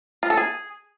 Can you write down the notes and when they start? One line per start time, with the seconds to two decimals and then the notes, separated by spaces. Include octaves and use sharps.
0.23 F4
0.30 A4
0.37 G#4